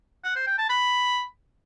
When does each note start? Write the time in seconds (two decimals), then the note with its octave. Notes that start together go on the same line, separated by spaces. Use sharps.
0.24 F#5
0.36 C5
0.47 G5
0.58 A5
0.70 B5